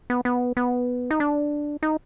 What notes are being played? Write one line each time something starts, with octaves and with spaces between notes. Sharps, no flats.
B3
B3
B3
D#4
D4
D#4